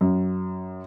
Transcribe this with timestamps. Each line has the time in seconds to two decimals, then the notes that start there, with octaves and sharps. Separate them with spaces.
0.01 F#2